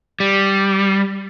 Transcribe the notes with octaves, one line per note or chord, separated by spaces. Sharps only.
G3